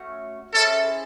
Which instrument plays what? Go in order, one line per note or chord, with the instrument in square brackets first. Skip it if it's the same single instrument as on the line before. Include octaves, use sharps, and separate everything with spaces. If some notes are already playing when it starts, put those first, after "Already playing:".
Already playing: [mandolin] A3 C#4 F#4 C#5
[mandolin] C#4 E4 G#4 C5 [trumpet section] A4